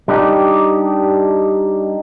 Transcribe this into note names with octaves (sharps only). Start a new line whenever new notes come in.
G3 D4 D#4 G4